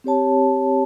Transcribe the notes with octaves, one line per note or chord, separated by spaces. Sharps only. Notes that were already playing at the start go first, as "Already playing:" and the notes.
C4 G4 C#5 A5